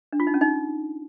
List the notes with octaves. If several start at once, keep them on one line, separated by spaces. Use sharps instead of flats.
D4
F4
D#4
C#4
D#4